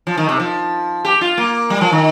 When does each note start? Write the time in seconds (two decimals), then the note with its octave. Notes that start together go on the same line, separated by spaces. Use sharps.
0.07 F3
0.17 D#3
0.29 C3
0.39 F3
1.05 G4
1.21 F4
1.38 A#3
1.70 G3
1.81 F3
1.92 D#3